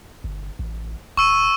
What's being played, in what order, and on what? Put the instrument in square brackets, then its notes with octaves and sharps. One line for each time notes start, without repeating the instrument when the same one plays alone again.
[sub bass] G1
A1
[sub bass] D#1 [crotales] C#6 E6 D#7